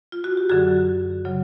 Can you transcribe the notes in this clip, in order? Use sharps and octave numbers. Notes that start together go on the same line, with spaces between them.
F4
F#4
G4
F#2 D3 F#3 F#4 G#4
C#3 F#3